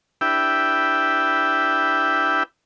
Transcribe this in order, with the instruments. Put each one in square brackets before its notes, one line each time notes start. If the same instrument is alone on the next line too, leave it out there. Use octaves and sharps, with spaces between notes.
[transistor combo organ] D4 E4 G4 B4 E5 G5